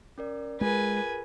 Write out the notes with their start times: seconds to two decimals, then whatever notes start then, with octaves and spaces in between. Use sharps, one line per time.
0.18 C#4 A#4 D5
0.61 G#3 F4 G#4 A#4 B4 G#5